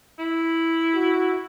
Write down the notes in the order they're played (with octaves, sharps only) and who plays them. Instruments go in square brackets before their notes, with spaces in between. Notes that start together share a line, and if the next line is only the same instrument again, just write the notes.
[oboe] E4
[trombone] F#4